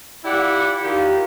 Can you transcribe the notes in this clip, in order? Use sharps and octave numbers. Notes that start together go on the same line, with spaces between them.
E4 F4 G4 D5 F#5
D#3 F4 G4